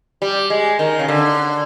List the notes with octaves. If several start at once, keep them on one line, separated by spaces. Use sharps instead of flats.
G3
G#3
D#3
C#3
D3